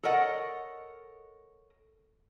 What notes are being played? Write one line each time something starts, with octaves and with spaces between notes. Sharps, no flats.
A4 A#4 C#5 D#5 F#5